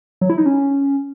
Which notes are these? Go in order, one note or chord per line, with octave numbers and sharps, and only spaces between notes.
F#3
E4
D#4
C#4